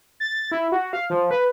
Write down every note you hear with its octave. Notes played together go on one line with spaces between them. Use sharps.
A6
E4
F#4
F5
F3
B4